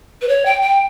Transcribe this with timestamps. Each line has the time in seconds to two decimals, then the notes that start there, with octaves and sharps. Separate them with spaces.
0.22 B4
0.29 C#5
0.46 G5
0.62 G5